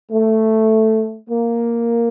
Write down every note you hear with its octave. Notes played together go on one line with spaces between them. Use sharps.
A3
A#3